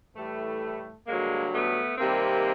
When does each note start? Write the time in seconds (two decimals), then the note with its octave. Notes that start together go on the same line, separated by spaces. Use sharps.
0.16 A2 E3 G3 A3
1.07 G2 D3 F#3 G#3 A#3
1.53 A3 B3
1.98 C3 D#3 G3 A#3 C4